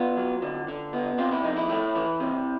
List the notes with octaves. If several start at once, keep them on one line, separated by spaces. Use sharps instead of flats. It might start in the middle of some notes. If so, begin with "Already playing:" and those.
Already playing: B3 F4
F#3
D3
D3
B3
C3 F4
E4
F2 D#4
E4
A3
E3
C3